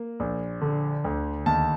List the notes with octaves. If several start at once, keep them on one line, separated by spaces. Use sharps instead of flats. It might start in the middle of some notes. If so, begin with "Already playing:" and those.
Already playing: A#3
A#1
D3
D2
D#2 A5